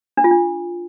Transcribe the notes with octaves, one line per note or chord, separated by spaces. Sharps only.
D4
F4
D4